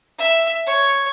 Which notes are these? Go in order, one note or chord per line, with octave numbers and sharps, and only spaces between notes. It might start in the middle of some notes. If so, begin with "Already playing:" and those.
E5
C#5